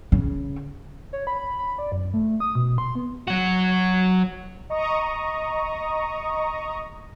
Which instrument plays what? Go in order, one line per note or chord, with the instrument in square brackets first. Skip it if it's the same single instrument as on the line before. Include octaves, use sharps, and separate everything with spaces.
[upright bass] C#3
[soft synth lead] C#5
B5
B5
D5
F#2
A3
D#6
B2
C6
B3
[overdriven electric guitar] F#3 F#4
[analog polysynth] D#5 A#5 C#6 D#6